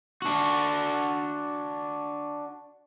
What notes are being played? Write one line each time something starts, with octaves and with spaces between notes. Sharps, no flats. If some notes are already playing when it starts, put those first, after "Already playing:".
D4 F#4